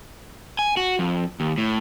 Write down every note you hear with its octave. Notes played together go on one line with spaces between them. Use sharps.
G#5
F#4
F2
D#2
A2